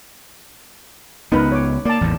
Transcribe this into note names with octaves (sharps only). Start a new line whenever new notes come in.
C#2 B3 D#4 A#4 B4
C#5 D6
A#3 D5 A5
A1 E2 G#2